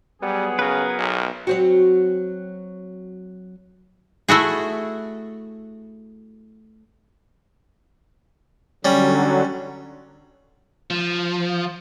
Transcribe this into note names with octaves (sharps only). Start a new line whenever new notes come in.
F#3 G3 B3 G#4
C#3 A#4 B4
B1
F#3 C4 F#4
A3 E4 F#4 G#4
D3 F#3 G3 C#4
F3